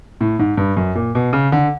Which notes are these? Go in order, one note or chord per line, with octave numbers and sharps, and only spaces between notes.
A2
G#2
G2
F#2
A#2
B2
C#3
D3